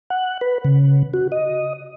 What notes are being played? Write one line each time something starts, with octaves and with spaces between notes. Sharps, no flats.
F#5
B4
C#3
F#4
D#5